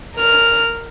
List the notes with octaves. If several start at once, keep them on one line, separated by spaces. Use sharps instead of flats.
A#4 F6